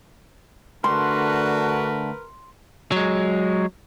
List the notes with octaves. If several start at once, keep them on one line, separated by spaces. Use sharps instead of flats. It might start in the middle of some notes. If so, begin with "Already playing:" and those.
D3 A3 D4 F#4 A#4 B4 C6
F#3 G#3